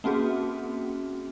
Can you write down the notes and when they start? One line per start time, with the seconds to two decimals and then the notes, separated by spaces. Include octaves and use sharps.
0.04 A#3 C4 C#4 F#4 G#4